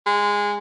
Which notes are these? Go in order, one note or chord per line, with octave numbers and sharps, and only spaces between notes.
G#3